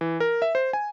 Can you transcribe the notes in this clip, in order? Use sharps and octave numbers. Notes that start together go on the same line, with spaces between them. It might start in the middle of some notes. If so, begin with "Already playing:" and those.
E3
A#4
E5
C5
G#5